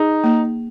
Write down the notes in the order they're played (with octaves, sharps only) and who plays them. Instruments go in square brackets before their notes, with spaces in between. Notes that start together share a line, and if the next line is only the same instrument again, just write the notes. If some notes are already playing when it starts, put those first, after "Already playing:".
Already playing: [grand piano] D#4 [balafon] G#4
[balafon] A#3